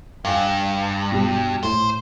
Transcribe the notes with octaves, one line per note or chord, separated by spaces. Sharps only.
G2 F5 G#5
B2 G3
A2 A3 C5